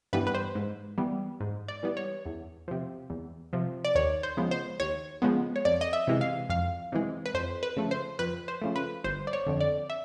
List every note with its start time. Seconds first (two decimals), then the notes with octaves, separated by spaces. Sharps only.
0.13 G2 E3 G3 B3 B4
0.27 B4
0.35 C5
0.55 G#2
0.98 E3 G3 B3
1.41 G#2
1.68 D5
1.83 E3 G3 B3
1.97 C#5
2.26 E2
2.68 C3 F3
3.10 E2
3.53 C3 F3
3.85 D5
3.95 D#2 C#5
4.23 C5
4.37 C#3 F3 G#3 B3
4.51 C5
4.80 D#2 C#5
5.22 C#3 F3 G#3 B3
5.56 C#5
5.65 F2 D5
5.81 D#5
5.93 E5
6.07 C3 E3 G#3
6.21 F5
6.49 F2 F5
6.92 C3 E3 G#3
7.26 B4
7.34 F2 C5
7.63 B4
7.77 C#3 F3 A3
7.91 C5
8.19 F2 B4
8.48 C5
8.62 C#3 F3 A3
8.76 B4
9.04 G1 C5
9.27 D5
9.33 C#5
9.46 F2 D3
9.61 D5
9.90 E5